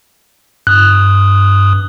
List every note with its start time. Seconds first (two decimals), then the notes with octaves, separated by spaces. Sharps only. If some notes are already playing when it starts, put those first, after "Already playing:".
0.67 G2 D#6 F#6